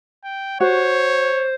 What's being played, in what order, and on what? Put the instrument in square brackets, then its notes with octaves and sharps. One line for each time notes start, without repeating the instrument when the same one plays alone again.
[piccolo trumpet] G5
[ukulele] F#4 [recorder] C5 [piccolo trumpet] C#5